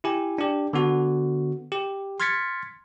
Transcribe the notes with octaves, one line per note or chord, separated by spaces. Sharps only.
E4 G4 G#5
D4 G4
D3 B3 F#4
G4
C6 F6 G#6 A6 B6 C#7